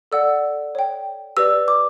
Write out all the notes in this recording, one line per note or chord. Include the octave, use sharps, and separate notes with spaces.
A4 D5 F#5 E6
C#5 G5
G4 B4 D5 E6
D6